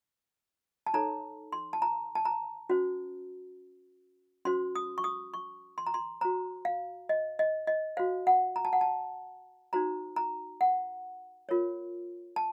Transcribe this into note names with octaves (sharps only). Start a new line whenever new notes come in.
A5
D#4 A4 C#5 A#5
C6
A5
A#5
A5
A#5
C#4 F#4 C5
C#4 F#4 C5 C6
D#6
C#6
D#6
C#6
C6
A#5
C6
F#4 C5 A#5
F5
D#5
D#5
D#5
F#4 C5 F5
F#5
A#5
A5
F#5
A5
D#4 F#4 C5 A#5
A#5
F#5
F4 A#4 C#5
A5